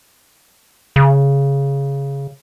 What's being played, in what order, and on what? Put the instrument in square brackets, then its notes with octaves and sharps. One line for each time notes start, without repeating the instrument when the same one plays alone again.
[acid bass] C#3